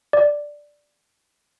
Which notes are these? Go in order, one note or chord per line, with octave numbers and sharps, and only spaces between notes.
D5